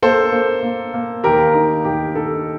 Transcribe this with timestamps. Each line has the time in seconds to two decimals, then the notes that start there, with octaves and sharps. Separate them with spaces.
0.03 A#3 A4 C5
0.32 A#3
0.63 A#3
0.94 A#3
1.24 D#2 G4 A#4
1.54 D#4
1.85 D#2 G4
2.15 D#4 A4